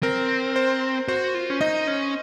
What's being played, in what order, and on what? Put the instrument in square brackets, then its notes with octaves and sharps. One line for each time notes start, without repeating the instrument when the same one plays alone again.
[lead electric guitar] C4 [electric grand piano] A#4
[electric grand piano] C5
[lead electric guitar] F#4 [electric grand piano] C5
[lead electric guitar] F4
C#4
[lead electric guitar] D#4 [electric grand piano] D#5
[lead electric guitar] C#4